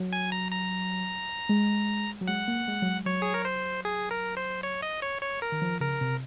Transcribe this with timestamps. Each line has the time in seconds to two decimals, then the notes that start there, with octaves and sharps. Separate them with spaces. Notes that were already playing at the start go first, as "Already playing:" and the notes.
Already playing: F#3
0.13 G#5
0.32 A#5
0.52 A#5
1.49 G#3
2.21 F#3
2.27 G#3 F#5
2.48 A#3
2.68 G#3
2.82 F#3
2.86 G#3
3.06 F#3 C#5
3.22 G#4
3.34 A#4
3.45 C5
3.85 G#4
4.11 A#4
4.37 C5
4.63 C#5
4.82 D#5
5.02 C#5
5.22 C#5
5.42 A#4
5.52 D#3
5.62 F3
5.80 C#3 A#4
6.01 C3